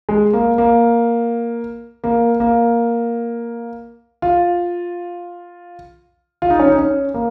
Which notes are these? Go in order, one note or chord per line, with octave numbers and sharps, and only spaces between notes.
G#3
A#3
A#3
A#3
A#3
F4
F4
D#4
C#4
D#4
C#4
A#3